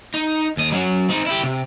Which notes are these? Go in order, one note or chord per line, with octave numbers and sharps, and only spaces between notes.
D#4
D#2 D#5
F#3 C#4
C4 D#4
E4 G4
C3